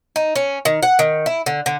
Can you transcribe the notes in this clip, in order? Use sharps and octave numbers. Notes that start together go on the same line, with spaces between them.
D#4
C#4
D#3
F#5
D#3
E4
D3
D3